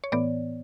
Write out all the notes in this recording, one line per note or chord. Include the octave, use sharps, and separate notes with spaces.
C#5
A2 E3 B3 D5